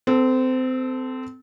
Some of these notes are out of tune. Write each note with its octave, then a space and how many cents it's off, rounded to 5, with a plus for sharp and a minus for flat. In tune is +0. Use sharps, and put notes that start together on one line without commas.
C4 -25 A4 +0